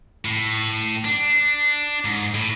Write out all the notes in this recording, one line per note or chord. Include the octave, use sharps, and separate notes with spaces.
A2
D4
G#2
A2